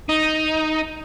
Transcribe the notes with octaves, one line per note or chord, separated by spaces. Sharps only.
D#4